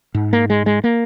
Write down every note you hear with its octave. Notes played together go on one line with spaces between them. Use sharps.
G#2
A#3
G#3
G#3
A#3